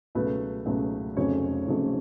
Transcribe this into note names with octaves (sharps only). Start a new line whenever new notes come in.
C#2 B2 F#3 A3 B4
C#2 B2 F#3 A3
F1 F2 C#3 F#3 A3 C#5
F1 F2 C#3 F#3 A3